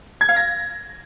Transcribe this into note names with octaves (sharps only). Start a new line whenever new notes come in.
G#6
F5
A#6